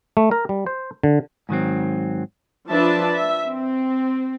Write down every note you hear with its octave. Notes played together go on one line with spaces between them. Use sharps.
A3
A#4
G3
C5
D3
G#2 D#3 F#3 C4
F3 D4 B4 E5 A5
E5
C4